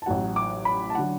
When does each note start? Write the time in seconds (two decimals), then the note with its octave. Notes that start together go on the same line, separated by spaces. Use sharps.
0.02 A5
0.06 A1 A2 F#3 F#5
0.36 D6
0.65 B5
0.90 A5
0.95 D3 F#3 F#5